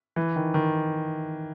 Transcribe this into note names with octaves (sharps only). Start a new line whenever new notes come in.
E3
D#3
D#3